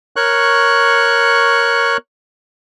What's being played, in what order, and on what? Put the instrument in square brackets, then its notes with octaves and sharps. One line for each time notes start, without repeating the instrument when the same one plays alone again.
[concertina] A#4 C#5 C#6 F#6